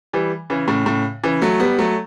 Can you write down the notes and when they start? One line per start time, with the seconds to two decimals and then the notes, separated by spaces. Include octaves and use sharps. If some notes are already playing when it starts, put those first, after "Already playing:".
0.13 E3 G3
0.50 C#3 E3
0.68 A2 C#3
0.86 A2 C#3
1.24 C#3 E3
1.42 F#3 A3
1.60 G3 B3
1.78 F#3 A3